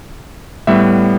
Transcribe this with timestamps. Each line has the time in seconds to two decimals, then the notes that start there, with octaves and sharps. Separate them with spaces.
0.67 A2 G3 B3 E5